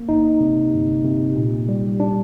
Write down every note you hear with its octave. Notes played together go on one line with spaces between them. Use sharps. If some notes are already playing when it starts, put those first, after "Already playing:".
Already playing: A#3
G1 D#4
C3
G1
C3
A#2
G3
G3 D4